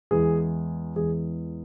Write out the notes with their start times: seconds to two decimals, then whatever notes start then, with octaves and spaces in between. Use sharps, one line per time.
0.11 E2 E3 G#3 G#4
0.96 E2 E3 G#3 G#4